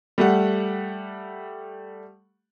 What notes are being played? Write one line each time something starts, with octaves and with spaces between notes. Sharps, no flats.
G3 A3 F#5